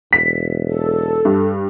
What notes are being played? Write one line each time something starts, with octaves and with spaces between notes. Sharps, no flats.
E1 B6
A4
G2